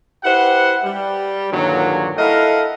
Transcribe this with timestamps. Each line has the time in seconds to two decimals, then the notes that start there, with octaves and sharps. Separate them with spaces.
0.24 E4 G4 B4 C5 F#5
0.84 G3
1.52 G2 A#2 D3 D#3 F#3
2.17 E4 A4 A#4 D#5 F5 F#5